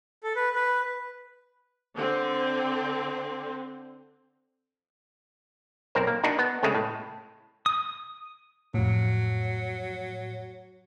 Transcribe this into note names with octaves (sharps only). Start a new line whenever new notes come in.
A4
B4
B4
D3 C4
B1 C4 A#4 C5
A#3
D4 D#4 F#4
B3
C#3 G#3 A3 C4
A2
D#6
F2 A2 F#3